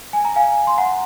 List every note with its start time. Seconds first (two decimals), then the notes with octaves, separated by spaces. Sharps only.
0.13 G#5
0.25 A#5
0.36 F5 G#5
0.67 C6
0.77 F#5 A#5